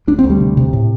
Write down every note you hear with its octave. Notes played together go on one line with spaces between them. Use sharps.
D2 D4
C4
D2
G3
C3
C3
A2